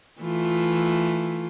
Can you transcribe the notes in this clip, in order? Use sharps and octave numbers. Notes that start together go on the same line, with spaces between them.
E3 A3 F4